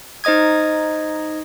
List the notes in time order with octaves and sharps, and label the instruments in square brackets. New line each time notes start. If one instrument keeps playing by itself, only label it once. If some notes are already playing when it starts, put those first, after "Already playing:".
[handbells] D#4 C5 D#5 D#6 G#6